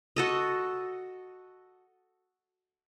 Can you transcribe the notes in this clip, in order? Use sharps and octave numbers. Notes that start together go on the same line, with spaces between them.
F#4 A4 D#5